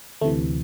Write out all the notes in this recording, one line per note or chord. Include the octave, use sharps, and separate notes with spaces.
D2 C3 E3 A3